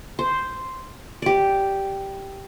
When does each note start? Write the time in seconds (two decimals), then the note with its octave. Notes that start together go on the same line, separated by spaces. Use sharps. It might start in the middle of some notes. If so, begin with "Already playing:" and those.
0.19 C5
1.22 G4 D5